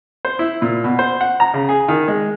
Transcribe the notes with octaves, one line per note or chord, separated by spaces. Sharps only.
C5
E4
A#2
B2
C5
F#5
A#5
C#3
G#4
D#3
G#3